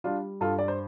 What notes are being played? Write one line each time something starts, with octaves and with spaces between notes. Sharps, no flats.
G3 D4 F4
G2 F4 A4
D5
C5